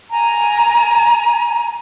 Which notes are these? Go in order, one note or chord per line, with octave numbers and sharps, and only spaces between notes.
G#5 A#5